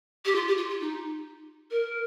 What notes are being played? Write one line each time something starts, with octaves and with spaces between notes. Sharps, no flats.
G4
F4
G4
F4
F4
D#4
A#4